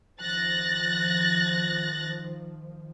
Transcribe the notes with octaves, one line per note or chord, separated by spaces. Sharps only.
D#3 F3 F#6 A6 A#6